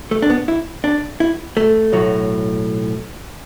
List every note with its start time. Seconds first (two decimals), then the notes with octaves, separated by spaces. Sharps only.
0.11 A3
0.22 D4
0.30 B3
0.48 E4
0.84 D4
1.20 E4
1.57 A3
1.92 B1 A2 F#3